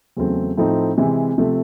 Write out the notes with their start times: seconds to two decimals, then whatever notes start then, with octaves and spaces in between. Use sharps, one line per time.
0.17 E2 C#3 F#3 A3 C4
0.57 A2 F3 A3 C4 D#4
0.98 C3 E3 G#3
1.38 C3 F3 A3